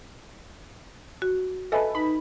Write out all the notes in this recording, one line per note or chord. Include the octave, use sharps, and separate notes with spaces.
F#4
A4 B4 D#5 E5 G#5
D#4 B5